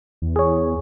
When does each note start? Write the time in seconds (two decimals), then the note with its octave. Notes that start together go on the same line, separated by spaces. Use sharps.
0.22 E2
0.36 G#4 C#5